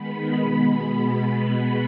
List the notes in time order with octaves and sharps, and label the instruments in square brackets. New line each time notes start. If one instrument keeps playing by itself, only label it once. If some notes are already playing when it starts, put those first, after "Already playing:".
Already playing: [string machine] D#3 G#3 B3 B5
B2 G#3 B3